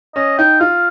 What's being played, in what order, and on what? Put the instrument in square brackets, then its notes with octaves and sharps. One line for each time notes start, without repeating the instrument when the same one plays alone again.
[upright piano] C#4 [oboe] D#5
[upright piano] D#4 [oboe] G5
[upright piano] F4 [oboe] F5